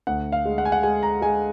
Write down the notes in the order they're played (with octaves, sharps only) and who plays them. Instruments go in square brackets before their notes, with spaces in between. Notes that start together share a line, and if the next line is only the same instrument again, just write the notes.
[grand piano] D2 F#5
F5
G#3
F#5
G#5
F#5
G#3 G#5
A#5
G#3 G#5